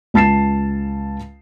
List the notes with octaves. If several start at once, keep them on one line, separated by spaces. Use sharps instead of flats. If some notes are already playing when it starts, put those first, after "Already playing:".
C#2 A5 A6 C7 E7